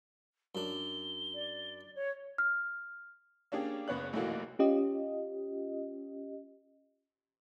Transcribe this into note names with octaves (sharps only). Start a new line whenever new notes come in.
F#2 D4 G7
D5
C#5
F6
A#3 C#4 D4 G4 G#4
F#1 B3 C#5 F#6
F1 B1 E3 A3 A#3 F#4
C#4 F4 G4 D#5